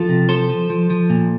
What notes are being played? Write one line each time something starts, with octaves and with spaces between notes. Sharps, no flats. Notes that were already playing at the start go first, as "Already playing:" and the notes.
Already playing: F3 F4 A4
C3
F3 A4 C5
F3
F3
F3
A#2